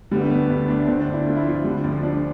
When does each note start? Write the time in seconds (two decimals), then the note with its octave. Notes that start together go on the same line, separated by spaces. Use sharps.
0.11 D3 G3
0.16 B3
0.21 A3
0.30 D2 B3
0.49 D2
0.68 A3 D4
0.88 D3 C4
1.01 D4
1.07 D2
1.13 E4
1.26 A3 F4
1.36 E4
1.46 F3 F4
1.55 E4
1.64 D3 G3
1.83 D2 F3
2.03 F3 D4